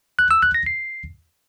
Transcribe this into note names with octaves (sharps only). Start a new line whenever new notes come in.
F#6
E6
F#6
A#6
C7